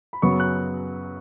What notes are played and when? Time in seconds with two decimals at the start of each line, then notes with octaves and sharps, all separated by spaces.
0.13 B5
0.22 F#2 C#3 F#3 B3 C#6
0.40 F#6